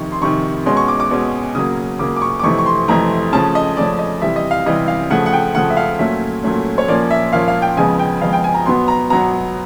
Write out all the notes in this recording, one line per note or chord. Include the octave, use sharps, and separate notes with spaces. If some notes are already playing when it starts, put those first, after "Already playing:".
Already playing: F2 C3 D#3 C#6
C6
F2 C3 D#3 C#6
B2 G#3 C#4 C6
C#6
D6
D6
B2 G#3 C#4
C#3 F#3 A#3 D#6
C#3 F#3 A#3 D6
D6
C#6
D6
F2 C3 E3 A3 C4 C#6
C#6
C6
F2 C3 E3 A3 C4 A#5
C#3 F3 A3 C#4 A5
D#5
C#3 F3 A3 C#4 D5
D#5
C3 E3 G3 E5
D#5
F5
C3 E3 G3 D#5
F5
C#3 F3 A3 F#5
F#5
G5
C#3 F3 A3 F#5
E5
F5
A#2 F#3 A3 C#4 E5
A#2 F#3 A3 C#4
C#5
A#2 F3 A#3 C#4 D5
E5
A#2 F3 A#3 C#4 F5
F5
G5
F2 C#3 F3 G#3 B3 G#5
G5
F2 C#3 F3 G#3 B3 F5
G5
G#5
A#5
B2 F#3 B3 C6
A#5
B2 F#3 B3 A#5